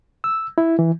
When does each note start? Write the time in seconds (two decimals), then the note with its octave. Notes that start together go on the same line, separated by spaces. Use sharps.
0.24 E6
0.58 E4
0.79 E3